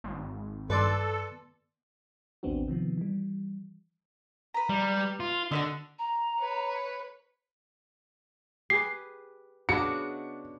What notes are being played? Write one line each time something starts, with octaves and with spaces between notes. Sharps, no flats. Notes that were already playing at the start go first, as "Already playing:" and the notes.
G#1
G2 A4 B4 D5 C6
A1 D#2 B3 C4 D4 F#4
C3 D#3 F3 B3
E3 G3
B4 A#5
G3
F4
D3 F#4 B4 D#5
A#5
B4 C#5
G4 G#4 B4 C7
C#3 B3 D4 F#4 D#5 C#7